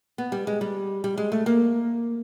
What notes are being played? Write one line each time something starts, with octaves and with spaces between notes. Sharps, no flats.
B3
G3
G#3
G3
G3
G#3
A3
A#3